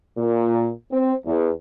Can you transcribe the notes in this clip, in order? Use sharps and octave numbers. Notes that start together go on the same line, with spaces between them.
A#2
C4
E2